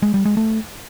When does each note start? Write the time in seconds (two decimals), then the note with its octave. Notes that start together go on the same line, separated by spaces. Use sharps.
0.02 G#3
0.14 G3
0.25 G#3
0.37 A3